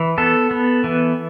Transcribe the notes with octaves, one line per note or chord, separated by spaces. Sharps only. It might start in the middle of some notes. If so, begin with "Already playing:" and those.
Already playing: E3
B3 A4
B3
E3